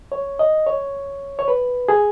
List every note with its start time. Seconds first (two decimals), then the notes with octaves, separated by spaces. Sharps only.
0.12 C#5
0.39 D#5
0.67 C#5
1.39 C#5
1.48 B4
1.89 G#4